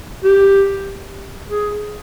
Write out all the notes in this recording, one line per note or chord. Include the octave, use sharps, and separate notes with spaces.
G4
G#4